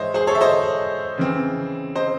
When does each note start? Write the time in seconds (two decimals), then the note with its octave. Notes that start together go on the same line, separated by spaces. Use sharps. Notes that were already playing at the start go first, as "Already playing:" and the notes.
Already playing: G#2 E3 G#3 C5 C#5 D#5 E5
0.14 G#4 C5
0.27 A4 C#5
0.35 E5
0.41 C5 D#5
1.18 C#3 E3 C4
1.95 C5 D#5